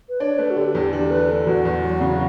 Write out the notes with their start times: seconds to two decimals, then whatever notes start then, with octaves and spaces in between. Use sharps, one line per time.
0.09 B4
0.20 D4 C#5
0.38 A3 B4
0.51 F#4
0.56 D3 G4
0.75 E2 G4
0.93 D4 G4
1.11 A3 B4
1.29 D3
1.46 E2 F#4
1.65 E2
1.83 F#3
2.01 C#3